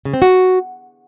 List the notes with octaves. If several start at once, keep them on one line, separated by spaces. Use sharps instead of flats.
C#3
C4
F#4